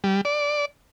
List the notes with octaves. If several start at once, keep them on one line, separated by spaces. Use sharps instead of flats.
G3
D5